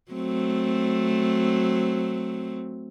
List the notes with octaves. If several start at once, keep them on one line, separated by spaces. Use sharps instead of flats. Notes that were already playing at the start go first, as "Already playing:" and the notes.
F#3 A3 C4